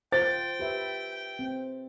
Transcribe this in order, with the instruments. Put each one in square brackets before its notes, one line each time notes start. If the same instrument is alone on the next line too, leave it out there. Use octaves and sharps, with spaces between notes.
[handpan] F4 [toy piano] C5 [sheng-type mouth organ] G5 [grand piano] A6
[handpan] G4 B4 E5
C4